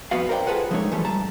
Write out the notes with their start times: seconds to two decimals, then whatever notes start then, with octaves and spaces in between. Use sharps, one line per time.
0.11 F2 B3 F#4 F5
0.29 A#4 C5 D5 D#5 G5
0.47 F4 G#4 A4 B4 C5 F#5
0.71 F3 G#3 A3 D4 D#4 C#5
0.91 E3 F3 G3 A3
1.05 G2 A5 A#5